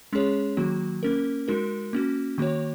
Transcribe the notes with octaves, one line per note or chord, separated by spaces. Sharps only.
G#3 C#4 G#4 C#5
D#3 F#3 A#3 F#4
A#3 C#4 A#4
G#3 D#4 F#4 A#4
A#3 C#4 F#4
D#3 A#3 F#4 C#5